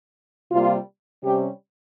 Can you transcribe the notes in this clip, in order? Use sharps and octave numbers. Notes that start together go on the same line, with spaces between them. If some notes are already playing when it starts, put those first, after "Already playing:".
C3 G3 A#3 F4
C3 G3 C#4 G4